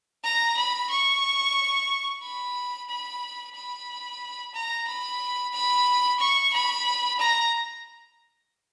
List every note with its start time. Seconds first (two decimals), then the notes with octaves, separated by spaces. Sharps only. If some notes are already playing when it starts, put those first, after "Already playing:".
0.24 A#5
0.57 B5
0.90 C#6
2.23 B5
2.89 B5
3.55 B5
4.54 A#5
4.88 B5
5.53 B5
6.19 C#6
6.53 B5
7.20 A#5